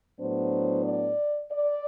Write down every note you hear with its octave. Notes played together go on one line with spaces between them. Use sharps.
A2 F#3 B3 D4 C5
D5
D5